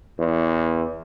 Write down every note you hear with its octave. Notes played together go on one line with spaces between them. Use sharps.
E2